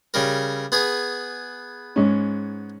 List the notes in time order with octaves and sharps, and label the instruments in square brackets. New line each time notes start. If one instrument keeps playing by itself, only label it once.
[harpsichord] C#3 G3 A#4
B3 G#4 B4
[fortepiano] G#2 C#4